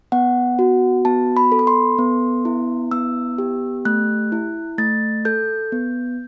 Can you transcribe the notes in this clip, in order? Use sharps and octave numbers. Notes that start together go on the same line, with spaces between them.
B3 F#5
F#4
B3 A5
B5
A4
B5
C6
B3
E4
B3 E6
G4
A3 F#6
E4
A3 A6
A4 G6
B3